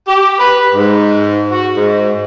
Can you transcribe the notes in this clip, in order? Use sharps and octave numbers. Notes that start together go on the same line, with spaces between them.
G4
B4
G#2
F#4
G#2